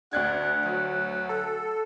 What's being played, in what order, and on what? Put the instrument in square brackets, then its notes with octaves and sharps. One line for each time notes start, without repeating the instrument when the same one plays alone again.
[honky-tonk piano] D2 F#6 G#6 [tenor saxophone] D4 [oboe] F#5
[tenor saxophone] F#3
[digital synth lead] A4